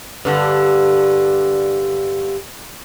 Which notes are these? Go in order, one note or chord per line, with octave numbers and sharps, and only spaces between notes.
G2 D3